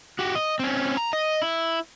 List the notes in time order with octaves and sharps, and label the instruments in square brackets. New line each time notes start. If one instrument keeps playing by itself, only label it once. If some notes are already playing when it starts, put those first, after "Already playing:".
[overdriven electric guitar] F#4 G4
D#5
C4 C#4
A#5
D#5
E4